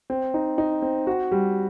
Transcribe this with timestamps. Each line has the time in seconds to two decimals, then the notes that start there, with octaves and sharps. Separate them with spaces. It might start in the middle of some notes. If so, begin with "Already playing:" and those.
0.10 C4
0.34 D#4
0.58 D#4
0.82 C4
1.07 F#4
1.32 G3